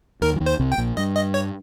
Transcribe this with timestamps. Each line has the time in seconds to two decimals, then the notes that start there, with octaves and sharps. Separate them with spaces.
0.22 D#2 D#3 A#4
0.36 F3
0.40 D#2 D#3
0.46 C5
0.59 C2 C3
0.72 G5
0.78 A#1 A#2
0.97 G2 D#5
1.15 D#5
1.34 C#5